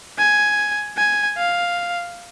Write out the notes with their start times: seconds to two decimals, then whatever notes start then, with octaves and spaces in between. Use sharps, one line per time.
0.19 G#5
0.98 G#5
1.38 F5